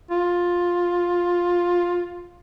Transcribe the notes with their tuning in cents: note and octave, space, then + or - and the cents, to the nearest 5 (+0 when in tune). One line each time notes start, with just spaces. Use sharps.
F4 +10